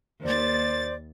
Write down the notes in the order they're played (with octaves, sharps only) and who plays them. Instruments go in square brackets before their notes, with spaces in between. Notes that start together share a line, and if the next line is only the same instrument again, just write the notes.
[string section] D#2 A6 [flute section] C5 D5